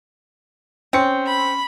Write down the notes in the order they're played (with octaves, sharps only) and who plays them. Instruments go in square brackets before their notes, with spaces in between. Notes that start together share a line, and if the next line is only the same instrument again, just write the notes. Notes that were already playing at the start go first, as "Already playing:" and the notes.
[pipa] C4 [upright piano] C#4 C#7
[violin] B5